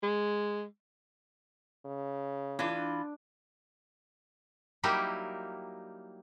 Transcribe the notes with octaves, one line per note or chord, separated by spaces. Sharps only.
G#3
C#3
E3 D4 F4
F#3 G3 A#3 D#4 E4 G4